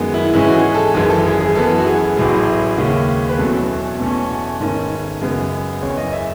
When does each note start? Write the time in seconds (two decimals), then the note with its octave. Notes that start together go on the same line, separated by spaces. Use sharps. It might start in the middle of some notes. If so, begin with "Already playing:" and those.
Already playing: F#2 D#3 G#3 B3
0.14 E4
0.34 G#2 E3 G#3 C#4 E4
0.49 F#4
0.54 G#4
0.74 A4
0.94 G#1 F#2 E3 G#4
1.10 A4
1.25 G#4
1.40 G#4
1.55 F#2 E3 B3 A4
1.78 F#4
1.86 G#4
2.17 A1 A2 F#3
2.78 D#2 C#3 G#3 C#4
3.29 B4
3.39 E2 B2 F#3 A3 C#4 A4
3.99 E2 B2 A3 C#4
4.60 G#1 G#2 D#3 A3 C#4
5.21 F#2 C#3 G#3 B3
5.82 F#1 E2 C#3 C#5
5.97 D#5
6.13 E5